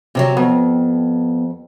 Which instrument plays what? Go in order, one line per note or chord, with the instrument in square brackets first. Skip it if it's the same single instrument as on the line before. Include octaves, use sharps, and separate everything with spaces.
[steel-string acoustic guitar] C3 F3 F#3
[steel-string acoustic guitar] F2 [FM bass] B3